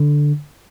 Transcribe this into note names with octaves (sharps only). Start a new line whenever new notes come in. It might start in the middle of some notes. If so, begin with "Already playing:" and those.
Already playing: D3